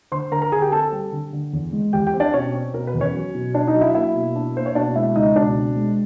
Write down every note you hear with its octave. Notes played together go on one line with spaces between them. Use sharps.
D3 C5 C6
D3 A#4 A#5
A#4 A#5
D3 G#4 G#5
G4 G5
C4 A4 A5
G3
D3
D3
E2
G#3
E2 G4 G5
G4 G5
C4
D4 D5
B2 C#4 C#5
C4
B2 A#4
B4
E2
C#4 C#5
F#3
B2
D4 D5
D#4 D#5
F#3
E4 E5
A#3 E4 E5
B2
D4
A#3 C5
C#5
B2 D4 D5
G#3 E4 E5
C#2 D#4 D#5
B2 D4 D5
C4
G#3